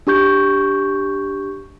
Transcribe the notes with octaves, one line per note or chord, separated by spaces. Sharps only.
D4 G4 C#6 G6